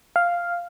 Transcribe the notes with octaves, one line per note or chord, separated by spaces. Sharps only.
F5